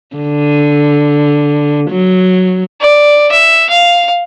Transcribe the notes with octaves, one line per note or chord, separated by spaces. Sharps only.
D3
F#3
D5
E5
F5